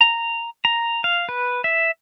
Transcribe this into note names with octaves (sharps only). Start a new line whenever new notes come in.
A#5
A#5
F5
B4
E5